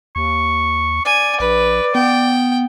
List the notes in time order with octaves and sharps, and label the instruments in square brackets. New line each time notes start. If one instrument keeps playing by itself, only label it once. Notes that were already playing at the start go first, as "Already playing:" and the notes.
[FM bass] D#2 [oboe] C#6
[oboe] D5 [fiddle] G#5
[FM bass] A#1 [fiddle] B4
[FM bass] B3 [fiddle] G5